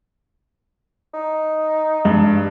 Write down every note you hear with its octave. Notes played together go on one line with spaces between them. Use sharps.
D#4
G2 G#3